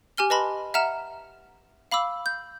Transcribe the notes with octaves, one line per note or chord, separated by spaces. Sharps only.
G4 G#5 F6 G7
B4 D#5 A5 B5 C6
E5 F#5 A#5 F6 E7
F5 B5 D6 E6
G6